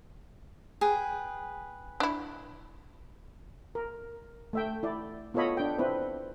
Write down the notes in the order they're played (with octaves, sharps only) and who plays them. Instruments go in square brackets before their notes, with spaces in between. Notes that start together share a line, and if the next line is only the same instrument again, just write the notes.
[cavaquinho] G#4 B4 G5
[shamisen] D4 E4
[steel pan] A#4
A3 E5 G5
E4 D5
B3 F4 A4 C#5 D#5 B5
D4 G5
C4 E4 B4